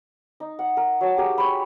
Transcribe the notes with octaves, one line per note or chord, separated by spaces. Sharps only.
D#4
F#5
A#4
F#3 A5
G4 G#4 A#4
C#5 B5